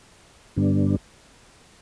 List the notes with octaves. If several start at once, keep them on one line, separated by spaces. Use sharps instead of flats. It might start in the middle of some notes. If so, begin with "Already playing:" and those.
G2 D3 G3 B3 D4